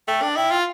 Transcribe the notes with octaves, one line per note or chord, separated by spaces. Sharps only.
A3 G5
D4
E4 G5
F4